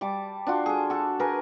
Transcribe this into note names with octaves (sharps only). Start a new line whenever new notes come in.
G3 A5 D6
D4 F4 F#4
G#4 A4
F#4 A4
G#4 A#4 B4 G#5